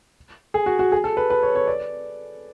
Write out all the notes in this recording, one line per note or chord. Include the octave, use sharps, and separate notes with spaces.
G#4
F#4
F#4
G#4
A4
B4
B4
C#5
C#5
D5